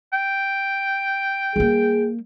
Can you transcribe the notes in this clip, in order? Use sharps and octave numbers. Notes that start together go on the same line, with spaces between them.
G5
G3 A#3 G#4